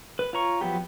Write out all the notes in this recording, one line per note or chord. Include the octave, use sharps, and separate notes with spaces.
B4
F4 C#5 A#5 C#6
F3 F#3 B3 G4